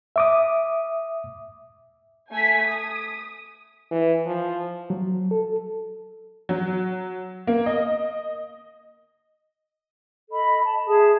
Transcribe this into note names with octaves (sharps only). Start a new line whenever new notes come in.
E5 D6 D#6
A3 G#5 B6
D#6
E3
F3
F#3
A4
F#3
A#3
D#5
A4 D#5 B5
A5
G#4 E5 A5 D#6